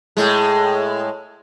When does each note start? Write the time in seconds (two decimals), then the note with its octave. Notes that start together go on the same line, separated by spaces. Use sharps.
0.17 A2 G#3